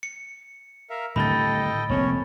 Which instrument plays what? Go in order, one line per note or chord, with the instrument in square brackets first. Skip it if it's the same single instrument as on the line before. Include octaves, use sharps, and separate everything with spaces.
[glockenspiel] C#7
[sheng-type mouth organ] A#4 E5 F5
[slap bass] A2 D3 G3 [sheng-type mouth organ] A4 D#5 G5 [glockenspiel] B5 A6
[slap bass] F1 A#3 C4 [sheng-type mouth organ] C#4 C#5